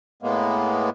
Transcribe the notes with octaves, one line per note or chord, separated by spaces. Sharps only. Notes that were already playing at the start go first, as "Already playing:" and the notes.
A2 G#3 A#3 B3